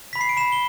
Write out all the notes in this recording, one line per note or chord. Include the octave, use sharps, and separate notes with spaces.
B5 B6
C7
D7
B5 E7
G7